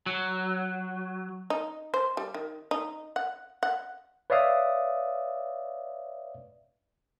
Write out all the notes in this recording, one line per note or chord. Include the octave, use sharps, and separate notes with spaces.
F#3
D#4
C5
G3
D#3
D#4
F#5
F#5
B4 C#5 D5 E5 F5 D#6